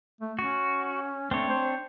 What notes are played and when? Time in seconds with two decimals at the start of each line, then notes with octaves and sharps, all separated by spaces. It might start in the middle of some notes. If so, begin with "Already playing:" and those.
0.21 A3
0.39 C#4 F#4
1.31 A3 C4 D4 C#5
1.49 C5